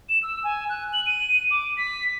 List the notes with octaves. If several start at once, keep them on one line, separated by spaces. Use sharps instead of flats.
E7
E6
G#5
F#6
F#7
D#7
D6
B6